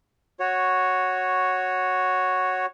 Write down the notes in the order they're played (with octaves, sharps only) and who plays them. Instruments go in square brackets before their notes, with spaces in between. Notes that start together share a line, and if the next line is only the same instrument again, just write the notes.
[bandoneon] F#4 C#5